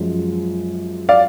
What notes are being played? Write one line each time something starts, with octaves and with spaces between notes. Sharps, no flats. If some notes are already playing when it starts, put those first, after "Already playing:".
Already playing: F#2 F3 G#3
D5 F5